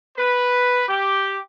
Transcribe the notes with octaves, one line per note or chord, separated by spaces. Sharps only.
B4
G4